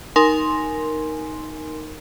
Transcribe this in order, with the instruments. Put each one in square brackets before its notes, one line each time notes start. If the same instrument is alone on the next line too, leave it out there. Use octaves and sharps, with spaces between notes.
[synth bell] D#4 A#4 G#5 C6